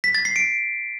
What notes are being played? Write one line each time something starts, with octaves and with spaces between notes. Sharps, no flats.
B6
A6
C7
D7